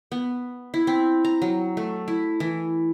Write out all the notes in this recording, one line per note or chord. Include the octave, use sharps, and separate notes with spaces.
B3
E4
C4
A#5
F#3
A3
E4
E3